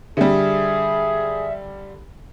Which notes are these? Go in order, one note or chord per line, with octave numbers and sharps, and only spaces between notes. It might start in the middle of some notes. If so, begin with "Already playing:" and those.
D3 G3 G#4 E5